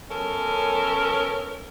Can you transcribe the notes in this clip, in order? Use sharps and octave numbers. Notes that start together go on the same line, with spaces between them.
F#2 B3 C#4 A4 A#4